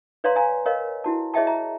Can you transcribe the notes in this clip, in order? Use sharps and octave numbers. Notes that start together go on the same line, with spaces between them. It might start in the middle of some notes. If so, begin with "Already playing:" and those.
B4 C#5 D5 F5 A#5 C6
F5 G#5 A#5
A#4 C#5 D#5 F5
E4 F#4 A5
G#4 C#5 D#5 E5 G5 A5
E5 A#5